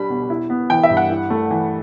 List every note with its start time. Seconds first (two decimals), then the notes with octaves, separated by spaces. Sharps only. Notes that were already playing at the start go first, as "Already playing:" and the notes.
Already playing: G3 D4 B5
0.10 B2
0.30 E4
0.50 B3
0.70 E3 G5
0.83 E5
0.90 G2
0.97 F#5
1.10 E4
1.30 A3
1.51 E3